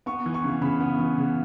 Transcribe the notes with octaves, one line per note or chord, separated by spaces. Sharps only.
B3 C#6
E3
C#6
C#3
C#3 B5
B3
E3
C#3